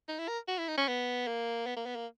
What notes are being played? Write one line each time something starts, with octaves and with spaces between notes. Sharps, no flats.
D#4
E4
A#4
F#4
E4
D#4
C#4
B3
A#3
B3
A#3
B3
A#3